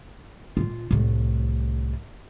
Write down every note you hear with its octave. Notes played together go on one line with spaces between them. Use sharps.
A#2 F4
C2 A2